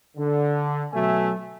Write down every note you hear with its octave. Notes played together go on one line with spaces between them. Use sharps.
D3
B2 F#3 A3 E5 G#5